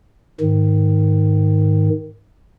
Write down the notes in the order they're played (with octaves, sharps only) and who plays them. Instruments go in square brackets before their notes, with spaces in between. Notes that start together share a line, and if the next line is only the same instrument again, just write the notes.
[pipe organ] G#2 D#3